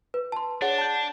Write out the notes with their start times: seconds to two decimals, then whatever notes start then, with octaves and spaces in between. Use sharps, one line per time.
0.14 B4
0.32 A5 C6
0.62 D4 G#4 C#5 F#5
0.78 A5 G6